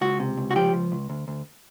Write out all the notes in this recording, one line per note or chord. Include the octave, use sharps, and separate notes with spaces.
C#2 F#4
C3
C#2
F#4
F3 G4
C#2
C#2
D2
D2